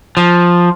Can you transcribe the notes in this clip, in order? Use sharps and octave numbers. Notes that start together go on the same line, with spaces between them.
F3